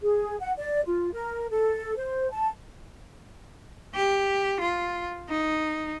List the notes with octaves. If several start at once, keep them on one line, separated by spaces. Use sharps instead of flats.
G#4
F#5
D5
F4
A#4
A4
C5
A5
G4
F4
D#4